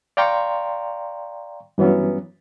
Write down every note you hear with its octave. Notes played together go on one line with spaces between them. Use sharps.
D5 F5 G5 A#5 C6 C#6
G2 E3 F#3 B3 C#4